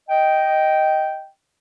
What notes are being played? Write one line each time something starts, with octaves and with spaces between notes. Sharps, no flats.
D#5 G5